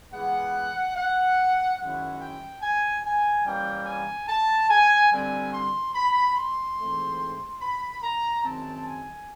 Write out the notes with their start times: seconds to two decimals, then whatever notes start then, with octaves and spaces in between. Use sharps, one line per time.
0.12 E3 G#3 B3 F#5
0.95 F#5
1.78 F#2 D#3 G#3 C#4 E4 F#5
2.21 G5
2.61 G#5
3.04 G#5
3.45 E3 G3 A#3 C#4 G5
3.86 G#5
4.28 A5
4.69 G#5
5.11 D3 G3 C4 G#5
5.52 C6
5.95 B5
6.36 C6
6.78 G#2 E3 A3 C4
7.61 B5
8.03 A#5
8.44 F#2 D#3 G#3 C4 A5
8.86 G#5